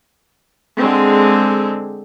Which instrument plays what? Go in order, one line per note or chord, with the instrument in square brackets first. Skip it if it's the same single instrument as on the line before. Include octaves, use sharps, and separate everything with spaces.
[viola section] D3 G#3 C4